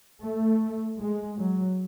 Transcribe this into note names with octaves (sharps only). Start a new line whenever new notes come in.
A3
G#3
F#3